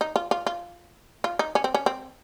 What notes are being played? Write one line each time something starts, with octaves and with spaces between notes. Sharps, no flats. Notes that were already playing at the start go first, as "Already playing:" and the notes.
D#4
F4
F4
F4
F4
D#4
C#4
C4
C#4
C4